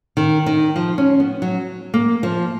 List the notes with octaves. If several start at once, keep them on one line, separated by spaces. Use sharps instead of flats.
D#3
D#3
F3
C#4
B3
F#3
A#3
F3